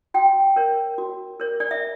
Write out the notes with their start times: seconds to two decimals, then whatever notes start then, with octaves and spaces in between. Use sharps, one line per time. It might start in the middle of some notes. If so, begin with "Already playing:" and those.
0.14 F#4 G5
0.56 A#4 C#5
0.98 F#4
1.40 A#4 C#5
1.60 D5
1.71 E5